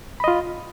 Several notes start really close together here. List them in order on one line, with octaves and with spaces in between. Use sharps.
B5 D#5 F4